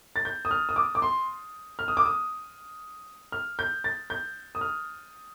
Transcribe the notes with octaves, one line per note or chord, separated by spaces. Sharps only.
A6
G6
D#6
F6
D#6
D6
D6
C6
F6
D#6
D6
D#6
F6
G6
A6
G6
D#6
F6